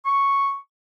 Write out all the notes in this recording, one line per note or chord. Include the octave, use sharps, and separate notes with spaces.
C#6